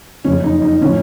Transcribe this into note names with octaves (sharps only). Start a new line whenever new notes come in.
F#1 F2 C#3 C#4
D#4
D#4
A2 F3 C#4